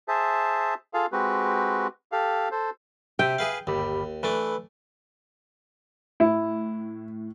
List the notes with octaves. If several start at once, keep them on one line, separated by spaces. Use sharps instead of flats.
G#4 C5 E5 A5
F4 G#4 A4 F5
G#3 C4 F#4 G4 B4
G4 A4 F5
A4 C5
C3 E5 G5
G#4 B4 F5
G1 D#2 G4 B5
E3 A3 D4 B4
A2 E4